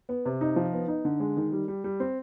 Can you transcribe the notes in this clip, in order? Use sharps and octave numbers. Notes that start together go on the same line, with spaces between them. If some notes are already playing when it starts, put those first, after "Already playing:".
B3
C3
D#4
F3
B3
D#4
D3
G#3
D#3
G3
G3
G3
C4